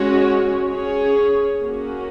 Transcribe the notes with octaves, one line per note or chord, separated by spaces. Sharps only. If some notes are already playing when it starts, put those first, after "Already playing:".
Already playing: G#3 C#4 F#4 C#5
C#4 G#4 C#5
A#3 C#4 F#4